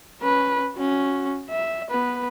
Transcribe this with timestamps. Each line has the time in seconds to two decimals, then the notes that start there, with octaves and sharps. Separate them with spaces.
0.21 C#4 B4
0.76 C#4 F#4
1.50 E5
1.90 B3 B4